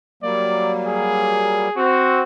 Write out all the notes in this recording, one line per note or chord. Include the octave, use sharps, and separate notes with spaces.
F#3 G3 A#3 D5
G#4
C4 F#4